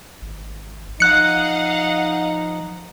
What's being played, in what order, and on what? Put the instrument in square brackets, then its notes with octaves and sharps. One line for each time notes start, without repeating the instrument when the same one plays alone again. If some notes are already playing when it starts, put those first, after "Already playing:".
[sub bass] G#1
[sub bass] F3 [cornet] D#4 [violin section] D#5 F5 F#5 [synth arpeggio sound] F#6 C#7